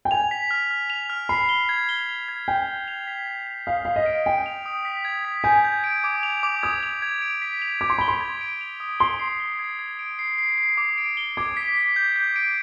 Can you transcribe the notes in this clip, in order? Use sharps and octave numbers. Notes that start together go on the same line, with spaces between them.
G5
G#5 F7
B6
F6
F6
F7
F6
B5 C7
G7
G#6
G7
G7
G#6
G5 G6
G6
F7
B6
G#6
F7
F5 D#6
F5 B6
D#5
D7
G5 D7
F7
D#6
B6
G#6
B6
G#5 G6
G6
D7
D6
F7
D6
D#6 G#6
F7
G#6
D7
B6
F7
D6 G#6
C6
B5 G7
C6
G#6
D7
F7
D#6
C6 G7
C7
G7
G#6
G#6
D7
C7
C7
C7
D6
D7
G7
D6 G#6
B6
B6
G6
G6
D7